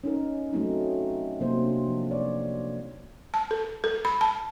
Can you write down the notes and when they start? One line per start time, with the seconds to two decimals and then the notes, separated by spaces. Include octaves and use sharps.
0.04 C#4 D#4 A#4
0.53 F#3 A3 C4 D#4
1.40 C3 F#3 A#3 C4 C5
1.62 D4
1.85 F3
2.11 C#5 D5
3.34 A5
3.51 A4
3.84 A4
4.05 B5
4.21 A5